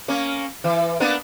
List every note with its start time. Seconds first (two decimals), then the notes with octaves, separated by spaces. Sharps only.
0.08 A#3 C#4
0.64 E3
1.00 A#3 B3 D4